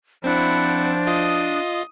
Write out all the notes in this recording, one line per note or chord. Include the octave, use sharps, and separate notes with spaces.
F3 C4 D4 E4 F#5
F4 D#5 D#6